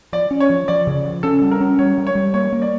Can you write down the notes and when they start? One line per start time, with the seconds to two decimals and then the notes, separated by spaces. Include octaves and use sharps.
0.12 F3 D5
0.31 C#4
0.40 C#5
0.50 F3
0.68 F3 D5
0.87 C#3
1.05 F3
1.23 C#4 A4
1.42 G3
1.51 A#4
1.61 C#4
1.79 G3 C#5
1.98 G3
2.07 C#5
2.15 G3
2.34 A#3 C#5
2.52 A#3
2.62 D5